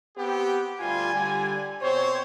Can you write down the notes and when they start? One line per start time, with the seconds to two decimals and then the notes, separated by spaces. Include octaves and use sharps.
0.17 B3 C4 G4
0.81 D2 G3 F4 G#5
1.14 D3 G3
1.82 B2 C4 C5 C#5